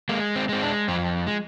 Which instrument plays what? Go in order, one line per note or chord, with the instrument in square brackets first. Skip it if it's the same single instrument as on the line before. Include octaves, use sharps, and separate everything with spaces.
[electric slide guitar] G#3 A#3
C4
G#3 C4
D4
F2 C4
G#3